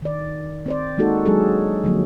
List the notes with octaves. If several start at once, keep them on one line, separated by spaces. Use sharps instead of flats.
D#3 D5
C4 C5 D5
G#3 A#3 D#4 F#4 A4
F#3 G#3 D4 G#4 A4
D3 F3 F#3 A#3